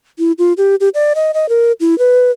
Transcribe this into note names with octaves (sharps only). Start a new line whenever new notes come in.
E4
F4
G4
G4
D5
D#5
D#5
A#4
E4
B4